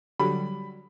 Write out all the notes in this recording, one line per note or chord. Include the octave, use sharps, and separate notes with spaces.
D3 F#3 G3 B5